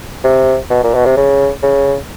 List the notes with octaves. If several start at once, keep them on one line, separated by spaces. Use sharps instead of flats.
C3
B2
A#2
B2
C3
C#3
C#3